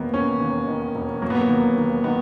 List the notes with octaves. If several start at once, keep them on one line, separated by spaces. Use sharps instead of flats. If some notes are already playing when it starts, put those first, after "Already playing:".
Already playing: E1 D#3 A#3 B3
E1 C#4
D#2
D#3
E1
F#3 A#3
B3
A#3
D#2
D#2
D#3 B3